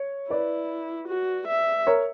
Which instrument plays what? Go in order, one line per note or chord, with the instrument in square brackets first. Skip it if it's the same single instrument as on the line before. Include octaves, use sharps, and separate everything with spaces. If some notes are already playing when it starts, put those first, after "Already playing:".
Already playing: [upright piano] C#5
[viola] E4 [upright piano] B4 D5
[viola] F#4
E5
[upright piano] A#4 C#5